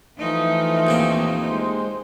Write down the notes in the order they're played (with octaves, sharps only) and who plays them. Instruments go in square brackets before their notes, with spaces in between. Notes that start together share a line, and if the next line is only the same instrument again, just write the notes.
[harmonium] E3 A3 [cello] F3 D#4
[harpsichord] D#2 A#2 C4
[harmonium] G#3 C5